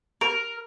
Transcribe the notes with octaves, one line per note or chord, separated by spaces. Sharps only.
A#4